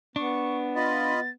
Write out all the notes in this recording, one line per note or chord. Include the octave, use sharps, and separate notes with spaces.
B3 D4 C#6
F4 D#5 B5 A6